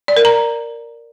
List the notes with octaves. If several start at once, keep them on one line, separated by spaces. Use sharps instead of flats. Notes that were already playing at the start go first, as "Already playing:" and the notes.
D5
A#4
A#5